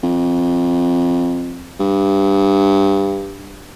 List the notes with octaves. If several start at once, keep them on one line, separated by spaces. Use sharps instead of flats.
F2
G2